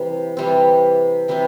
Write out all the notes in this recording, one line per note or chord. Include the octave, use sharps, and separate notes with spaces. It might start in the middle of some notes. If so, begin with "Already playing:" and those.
Already playing: C3 E3 G3 C4
C3 E3 G3 C4
C3 E3 G3 C4 B5